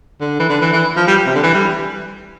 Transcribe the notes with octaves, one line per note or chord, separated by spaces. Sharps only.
D3
E3
D3
E3
E3
F3
G3
C3
D3
E3
G3